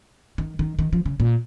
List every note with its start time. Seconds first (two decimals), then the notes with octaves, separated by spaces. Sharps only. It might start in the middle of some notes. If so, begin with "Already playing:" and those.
0.38 D#3
0.59 D#3
0.79 D#3
0.93 F3
1.06 C#3
1.20 A#2